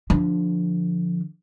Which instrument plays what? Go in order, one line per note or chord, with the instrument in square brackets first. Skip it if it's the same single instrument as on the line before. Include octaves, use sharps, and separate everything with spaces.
[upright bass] D3 F3